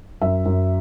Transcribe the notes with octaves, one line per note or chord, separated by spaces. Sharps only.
F#2 E5
F#2